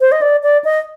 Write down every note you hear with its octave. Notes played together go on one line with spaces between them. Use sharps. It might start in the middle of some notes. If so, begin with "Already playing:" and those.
C5
D#5
D5
D5
D#5